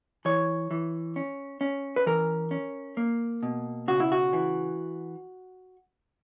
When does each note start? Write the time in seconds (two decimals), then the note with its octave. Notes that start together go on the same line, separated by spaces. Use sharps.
0.25 E3 C#5
0.71 E3
1.16 C#4
1.61 C#4
1.96 B4
2.06 E3 A#4
2.51 C#4
2.97 A#3
3.43 B2
3.88 C#3 F#4
4.00 E4
4.12 F#4
4.33 E3